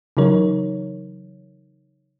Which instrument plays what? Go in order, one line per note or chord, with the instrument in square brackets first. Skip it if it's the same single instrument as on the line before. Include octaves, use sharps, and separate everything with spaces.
[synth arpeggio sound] C#3 E3 F#3 D#4 A#4 C#5